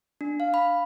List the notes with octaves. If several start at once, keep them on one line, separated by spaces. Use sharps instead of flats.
D4
F5
B5